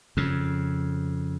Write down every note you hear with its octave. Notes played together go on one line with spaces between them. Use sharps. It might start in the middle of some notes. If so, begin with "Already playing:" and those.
F2 C#3